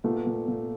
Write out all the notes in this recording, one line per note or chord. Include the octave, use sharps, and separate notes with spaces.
A#2 A3 B3
A#2
A#2